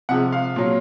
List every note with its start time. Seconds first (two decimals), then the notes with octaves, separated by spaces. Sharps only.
0.09 C3 F3 G#3 F#5
0.32 F5
0.56 A#2 F#3